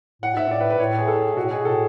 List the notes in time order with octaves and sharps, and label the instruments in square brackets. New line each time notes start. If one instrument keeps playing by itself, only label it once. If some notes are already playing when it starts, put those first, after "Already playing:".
[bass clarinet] A2 [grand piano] F#5
[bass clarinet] G#2 [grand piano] E5
[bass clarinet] A2 [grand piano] D5
[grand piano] B4
B4
[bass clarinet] A2 [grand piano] C#5
[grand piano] G#4
A4
G#4
[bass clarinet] B2 [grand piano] F#4
[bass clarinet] A2
[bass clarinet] B2 [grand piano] G#4
[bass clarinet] A2 [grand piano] A4